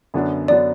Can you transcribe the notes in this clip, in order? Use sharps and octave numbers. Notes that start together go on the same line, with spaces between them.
F#2 D3 F#3 B3 D4
D3 F#3 B3 D4 D5